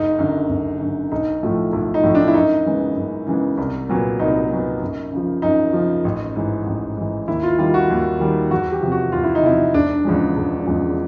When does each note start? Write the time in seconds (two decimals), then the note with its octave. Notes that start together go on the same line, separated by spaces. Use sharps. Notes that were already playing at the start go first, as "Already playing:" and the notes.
Already playing: F#1 D#4
0.19 F#2 D3
0.49 F#1
0.80 F#2 D3
1.12 B1 D#4
1.43 A2 F3 A3
1.72 B1
1.94 D#4
2.03 A2 F3 A3
2.15 D4
2.28 E4
2.34 F#2 D#4
2.66 C#3 E3 G#3 B3
2.96 F#2
3.27 C#3 E3 G#3 B3
3.57 C2
3.89 A#2 F#3 B3
4.19 C2 D#4
4.50 A#2 F#3 B3
4.82 F#2
5.12 C#3 F3
5.42 F#2 D#4
5.73 C#3 F3
6.04 A1
6.36 G#2 E3
6.67 A1
6.97 G#2 E3
7.28 D#2 E4
7.43 F4
7.58 D#3 G3 F4
7.74 F#4
7.90 D#2
8.20 D#3 G3
8.51 E2 F#4
8.72 G4
8.82 C3 F3
8.92 F#4
9.12 E2 F4
9.24 E4
9.35 D#4
9.43 C3 F3 E4
9.74 E1 D4
10.04 E2 C#3 F3 G#3
10.36 E1
10.67 E2 C#3 F3 G#3